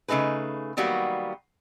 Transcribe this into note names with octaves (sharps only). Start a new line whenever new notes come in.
C#3 A3 D#4 G#4 B4
D#3 F#3 G3 A#3 B3 F#4